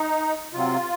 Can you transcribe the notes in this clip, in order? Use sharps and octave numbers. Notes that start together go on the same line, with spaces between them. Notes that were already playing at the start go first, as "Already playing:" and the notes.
Already playing: D#4
C3 F#3 C4 F4